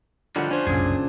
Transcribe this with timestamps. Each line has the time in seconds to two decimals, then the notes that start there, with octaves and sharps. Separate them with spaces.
0.36 A2 D3 D#3 F3 G3 F#5
0.51 C#4 D4 C5
0.67 F#1 C2 F#2 A#2 C#3 G#4